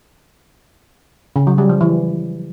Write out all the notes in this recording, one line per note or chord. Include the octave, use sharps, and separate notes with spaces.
C#3
F#3
G3
F3
E3